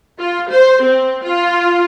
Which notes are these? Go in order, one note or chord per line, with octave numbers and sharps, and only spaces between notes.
F4
C5
C4
F4